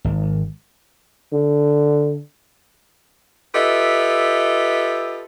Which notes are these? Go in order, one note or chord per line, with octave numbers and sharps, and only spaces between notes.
G#1
D3
F4 G4 A4 B4 D#5 E5